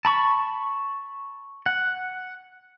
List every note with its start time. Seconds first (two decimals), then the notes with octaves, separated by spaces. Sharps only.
0.05 A5 B5 C#6
1.66 F#5